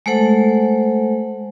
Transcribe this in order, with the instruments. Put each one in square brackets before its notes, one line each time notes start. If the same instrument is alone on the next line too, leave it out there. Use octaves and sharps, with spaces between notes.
[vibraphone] G#3 A3 A4 C5 F#5